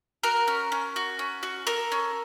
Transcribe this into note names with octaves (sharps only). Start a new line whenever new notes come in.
F#4 A#4
C#4
C#4
F#4
C#4
F#4
A4 A#4
C#4